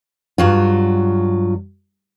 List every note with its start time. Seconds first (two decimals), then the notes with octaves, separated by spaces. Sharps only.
0.38 G2 F#3 F4